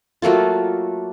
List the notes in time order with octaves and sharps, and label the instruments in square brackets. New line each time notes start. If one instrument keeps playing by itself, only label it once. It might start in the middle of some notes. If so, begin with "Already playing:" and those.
[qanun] F#3 A3 A#3 F4